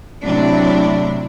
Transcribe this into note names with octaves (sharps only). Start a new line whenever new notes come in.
A2 C3 F#3 D4 E4